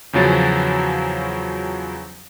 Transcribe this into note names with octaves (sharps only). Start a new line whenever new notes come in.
E2 C#3 F3 F#3 A6